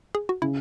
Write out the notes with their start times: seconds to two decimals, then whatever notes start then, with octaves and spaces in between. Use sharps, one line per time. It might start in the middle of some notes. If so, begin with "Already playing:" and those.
0.15 G#4
0.29 F#4
0.42 C#3 E4